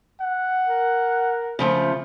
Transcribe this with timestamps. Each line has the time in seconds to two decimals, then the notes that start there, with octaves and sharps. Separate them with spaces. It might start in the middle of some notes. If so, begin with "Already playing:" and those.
0.21 F#5
0.66 A#4
1.59 C#3 F3 A3